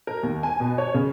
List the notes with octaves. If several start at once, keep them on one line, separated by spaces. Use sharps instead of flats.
A#4
D#2
G#5
B2
C#5
C#3